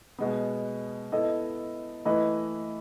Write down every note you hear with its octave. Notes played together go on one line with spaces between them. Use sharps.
B2 G#3 B3
B3 E4 A4 D#5
E3 A3 E4 B4 D#5